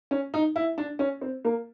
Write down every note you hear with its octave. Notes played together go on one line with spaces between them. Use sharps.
C#4
D#4
E4
D4
C#4
C4
A#3